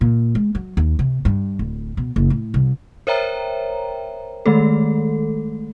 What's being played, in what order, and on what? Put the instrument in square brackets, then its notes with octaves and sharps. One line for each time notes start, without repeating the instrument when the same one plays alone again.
[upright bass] A#2
G#3
F#3
D#2
C3
G2
D1
B2
F#1
A2
C2
[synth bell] A#4 C5 C#5 E5 G5 A#5
D#3 G#3 A3 A4